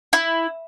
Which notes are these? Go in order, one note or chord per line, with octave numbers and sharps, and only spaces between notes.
E4